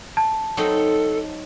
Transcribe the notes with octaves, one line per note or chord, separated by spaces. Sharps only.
A5
F#3 C4 D#4 A4